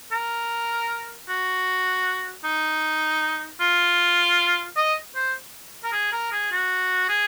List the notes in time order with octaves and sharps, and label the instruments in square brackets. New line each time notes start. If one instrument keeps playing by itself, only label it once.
[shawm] A#4
F#4
D#4
F4
D#5
C5
A#4
G#4
A#4
G#4
F#4
G#4